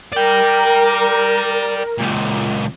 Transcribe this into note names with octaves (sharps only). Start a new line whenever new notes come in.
A#4 D5 G5
C#2 A#2